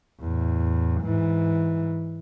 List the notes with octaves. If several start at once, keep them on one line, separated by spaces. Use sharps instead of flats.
E2 A2
G#2 E3